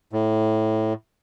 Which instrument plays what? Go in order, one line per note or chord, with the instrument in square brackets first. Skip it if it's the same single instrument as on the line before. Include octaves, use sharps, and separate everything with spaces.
[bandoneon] A2